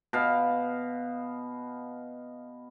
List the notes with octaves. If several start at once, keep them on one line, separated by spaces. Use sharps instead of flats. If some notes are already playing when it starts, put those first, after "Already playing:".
B2 F5